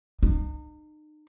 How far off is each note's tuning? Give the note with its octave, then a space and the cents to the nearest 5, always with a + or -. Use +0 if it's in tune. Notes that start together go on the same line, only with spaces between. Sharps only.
D#4 -40